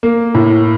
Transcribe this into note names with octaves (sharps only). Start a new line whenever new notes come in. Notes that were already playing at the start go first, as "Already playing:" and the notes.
A#3
A2